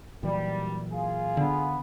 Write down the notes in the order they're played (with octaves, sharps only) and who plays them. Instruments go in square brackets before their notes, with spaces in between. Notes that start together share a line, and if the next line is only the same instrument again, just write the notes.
[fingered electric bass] A#2 E3 F#3 [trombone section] G3
[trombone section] F4 G#4
[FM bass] D3 [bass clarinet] B3